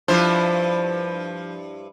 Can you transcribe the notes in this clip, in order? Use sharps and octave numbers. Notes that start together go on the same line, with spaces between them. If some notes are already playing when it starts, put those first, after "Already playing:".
G2 F3 E4 C5